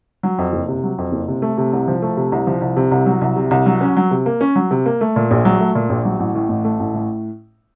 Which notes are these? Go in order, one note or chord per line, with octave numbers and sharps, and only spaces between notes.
F#3
F2
F#1
C3
F#3
F2
F#1
C3
A3
C3
C2
F3
A3
C3
C2
F3
C2
C3
C2
F#3
C2
C3
C2
F#3
C#4
F#3
C3
A#3
C#4
F#3
C3
A#3
A3
A#2
A#1
F#3
A3
A#2
A#1
F#3
A1
A2
A1
A3
A1
A2